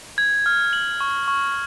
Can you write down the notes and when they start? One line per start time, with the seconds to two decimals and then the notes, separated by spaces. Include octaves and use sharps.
0.18 G#6
0.46 F6
0.73 F#7
1.00 C#6
1.28 C#6